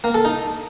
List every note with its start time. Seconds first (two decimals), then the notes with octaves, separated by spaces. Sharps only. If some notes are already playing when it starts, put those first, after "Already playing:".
0.04 A#3
0.14 A4
0.25 D#4